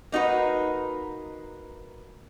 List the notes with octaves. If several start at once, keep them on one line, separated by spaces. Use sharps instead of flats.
A#3 D#4 F#4 B4